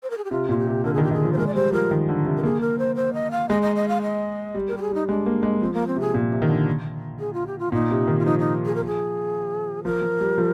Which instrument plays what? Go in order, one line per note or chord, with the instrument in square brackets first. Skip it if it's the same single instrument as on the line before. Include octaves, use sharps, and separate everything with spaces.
[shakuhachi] C5
A#4
G#4
G4
[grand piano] C3 [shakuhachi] F4
[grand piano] A#2 [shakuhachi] F4
[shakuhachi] G4
[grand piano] C3
[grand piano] D3 [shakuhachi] A#4
[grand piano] D#3 [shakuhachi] G#4
[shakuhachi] G4
[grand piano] D#3 [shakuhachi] G#4
[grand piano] F3
[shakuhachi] C5
[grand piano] G#3 [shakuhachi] A#4
[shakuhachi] D5
[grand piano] G3 [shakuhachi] C5
[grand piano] F3 [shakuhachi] A#4
[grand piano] D#3
D3
C3
[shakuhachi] A#4
[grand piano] A#3 [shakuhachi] G#4
[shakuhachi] A#4
C5
C5
D#5
F5
[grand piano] G#3 [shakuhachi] D#5
[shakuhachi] D#5
D#5
F5
D#5
[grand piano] G3
[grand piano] G3 [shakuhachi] A#4
[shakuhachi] G4
G#4
[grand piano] G3 [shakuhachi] D#4
[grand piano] G#3 [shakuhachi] D4
[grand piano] A#3
G#3
[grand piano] F3 [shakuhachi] C4
[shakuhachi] A#3
C4
[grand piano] C3 [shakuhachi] G#4
[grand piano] A#2
C3
D#3
D3
[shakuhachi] G#4
F4
G4
F4
[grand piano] A#2 [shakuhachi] D#4
[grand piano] C3
D#3
[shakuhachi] F4
[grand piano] F3 [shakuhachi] D#4
[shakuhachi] D#4
G#4
A#4
G#4
[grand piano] F3 [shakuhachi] A#4
[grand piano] F3
G3
F3